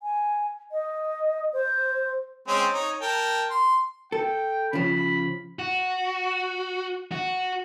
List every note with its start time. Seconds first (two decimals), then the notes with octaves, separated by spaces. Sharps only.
0.03 G#5
0.72 D#5
1.53 C5
2.48 G#3 C4 C#4
2.73 D#4 C#5
3.01 A#4 G5 A5
3.50 C6
4.12 A4 G5
4.73 C#3 F3 B5
5.59 F#4
7.12 F#4